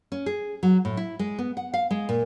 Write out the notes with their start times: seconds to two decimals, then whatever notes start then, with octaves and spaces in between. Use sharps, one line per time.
0.12 C#4
0.26 G#4
0.63 F#3
0.85 A2
0.97 E4
1.19 G#3
1.39 B3
1.57 F#5
1.74 F5
1.91 G#3
2.09 A#2